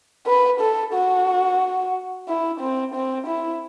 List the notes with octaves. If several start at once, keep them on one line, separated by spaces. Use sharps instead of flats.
B4
A4
F#4
E4
C4
C4
E4